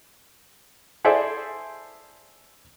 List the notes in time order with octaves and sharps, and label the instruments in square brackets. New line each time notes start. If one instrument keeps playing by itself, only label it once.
[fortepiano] E4 G#4 A4 C5 D5 E5